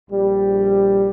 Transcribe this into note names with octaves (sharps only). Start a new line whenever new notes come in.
A#1 G3